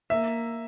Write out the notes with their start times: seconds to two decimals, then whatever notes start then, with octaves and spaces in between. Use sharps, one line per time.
0.10 A#3 E5